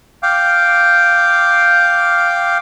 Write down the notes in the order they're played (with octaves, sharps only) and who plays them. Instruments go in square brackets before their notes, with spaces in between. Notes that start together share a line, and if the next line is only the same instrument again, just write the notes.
[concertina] F5 G5 D6